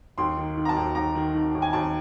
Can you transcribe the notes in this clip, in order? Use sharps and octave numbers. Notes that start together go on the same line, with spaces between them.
D#2 C6
D#3
D#3
A#5
A5
D#2
D#2 A#5
D#3
D#3
D#2
G#5
D#2 A5